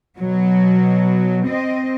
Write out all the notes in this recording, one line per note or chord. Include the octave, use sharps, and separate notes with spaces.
B2 F#3
C4 D#5